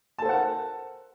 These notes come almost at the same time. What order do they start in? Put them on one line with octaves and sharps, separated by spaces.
A5 A4 C5 F#5 A#4